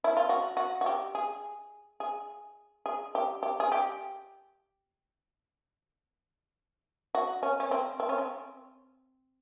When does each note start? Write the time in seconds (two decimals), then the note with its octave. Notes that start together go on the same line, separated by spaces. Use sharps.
0.04 E4
0.17 F4
0.29 F#4
0.57 F#4
0.81 F#4
0.86 G4
1.15 G#4
2.00 G#4
2.86 G#4
3.15 G4
3.43 G4
3.60 G#4
3.72 G4
7.15 F#4
7.43 C#4
7.60 C#4
7.71 C4
8.00 C4
8.09 C#4
8.18 C4